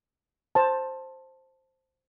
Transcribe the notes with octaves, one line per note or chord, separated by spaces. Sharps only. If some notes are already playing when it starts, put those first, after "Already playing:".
C5 A5